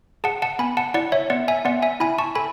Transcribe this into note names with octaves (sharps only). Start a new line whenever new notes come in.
G#4 F#5 A5
F#5 A5
B3 G#5 B5
F#5 A5
E4 D5 F#5
C#5 E5
B3 D5 F#5
E5 G#5
B3 D5 F#5
E5 G#5
E4 G#5 B5
A5 C#6
A4 G#5 B5